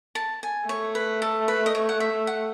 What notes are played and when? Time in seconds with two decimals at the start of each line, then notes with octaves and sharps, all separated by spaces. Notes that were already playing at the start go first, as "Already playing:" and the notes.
0.15 A5
0.43 G#5
0.69 A3 C#5
0.95 B4
1.22 A4
1.48 B4
1.66 D#5
1.75 C#5
1.89 F#5
2.00 E5
2.27 F#5